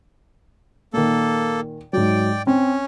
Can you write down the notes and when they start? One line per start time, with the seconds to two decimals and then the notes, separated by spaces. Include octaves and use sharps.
0.94 A#2 D#3 A#3 A4
1.93 G#2 F#3 D5 G5
2.47 C4 C#4